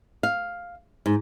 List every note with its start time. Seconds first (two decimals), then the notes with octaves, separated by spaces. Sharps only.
0.23 F5
1.06 G#2